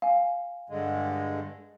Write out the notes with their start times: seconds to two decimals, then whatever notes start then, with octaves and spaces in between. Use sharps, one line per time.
0.02 F5 G#5
0.70 G2 D3 G#3